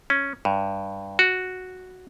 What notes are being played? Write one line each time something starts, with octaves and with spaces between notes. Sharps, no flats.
C#4
G2
F#4